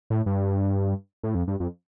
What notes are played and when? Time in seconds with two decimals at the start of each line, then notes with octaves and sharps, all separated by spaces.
0.10 A2
0.26 G2
1.23 A2
1.35 F2
1.47 G2
1.60 F2